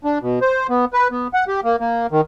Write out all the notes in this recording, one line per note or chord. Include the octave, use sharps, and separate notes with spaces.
D4
B2
C5
B3
B4
B3
F#5
G4
A#3
A#3
D#3